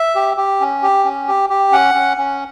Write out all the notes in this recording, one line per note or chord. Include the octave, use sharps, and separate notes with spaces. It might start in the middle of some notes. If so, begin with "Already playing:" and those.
Already playing: E5
G4
G4
C#4
G4
C#4
G4
G4
C#4 F#5
C#4
C#4